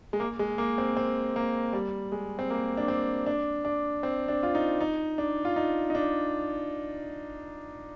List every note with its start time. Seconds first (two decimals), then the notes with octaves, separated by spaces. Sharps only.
0.13 G#3
0.20 A#3
0.39 G#3
0.58 A#3
0.78 C4
0.97 C4
1.36 A#3
1.73 G3
2.12 G#3
2.39 C4
2.50 A#3
2.77 D4
2.88 C4
3.26 D4
3.65 D4
4.03 C4
4.28 D4
4.43 F4
4.55 D#4
4.81 D#4
5.18 D4
5.45 F4
5.56 D#4
5.90 D#4
5.95 D4